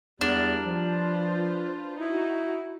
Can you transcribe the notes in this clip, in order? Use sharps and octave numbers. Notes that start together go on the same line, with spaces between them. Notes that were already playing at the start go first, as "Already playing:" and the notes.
E2 G3 D4 E4 A#4
F3 F4 B4 C5
D#4 E4 F#4